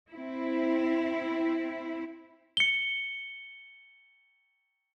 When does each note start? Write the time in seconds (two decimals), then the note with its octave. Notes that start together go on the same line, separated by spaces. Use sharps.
0.11 C4 E4
2.57 C#7 G7